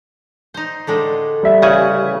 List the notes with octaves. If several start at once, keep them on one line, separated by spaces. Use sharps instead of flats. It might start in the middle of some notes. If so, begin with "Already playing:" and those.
D#4 C5
A2 D3 G#3
G3 E5
A1 C#3 F#5 G#5